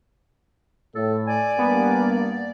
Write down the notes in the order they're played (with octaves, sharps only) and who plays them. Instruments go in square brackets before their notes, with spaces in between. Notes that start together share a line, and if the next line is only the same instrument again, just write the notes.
[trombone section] A2 [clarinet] A4
[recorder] D5 [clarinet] G#5
[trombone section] G2 A#3 [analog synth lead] B3